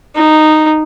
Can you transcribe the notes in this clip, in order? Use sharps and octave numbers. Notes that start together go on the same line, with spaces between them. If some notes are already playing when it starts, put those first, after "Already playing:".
D#4